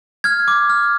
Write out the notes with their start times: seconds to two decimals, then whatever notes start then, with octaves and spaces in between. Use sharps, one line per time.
0.24 F6 G#6
0.48 D6
0.70 F6